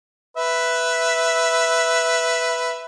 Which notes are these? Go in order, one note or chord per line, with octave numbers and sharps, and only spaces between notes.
B4 E5